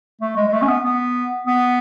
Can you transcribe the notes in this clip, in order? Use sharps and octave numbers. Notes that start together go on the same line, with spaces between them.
A3
G#3
G#3
A3
C#4
B3
B3
B3